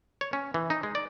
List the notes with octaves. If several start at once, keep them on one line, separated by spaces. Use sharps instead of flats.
C#5
C#4
E3
D#4
G#3
D5